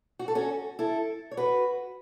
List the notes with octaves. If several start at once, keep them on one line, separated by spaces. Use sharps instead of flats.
F#4
A4
C#4 F#4
E4 A4
C#5
F#4 B4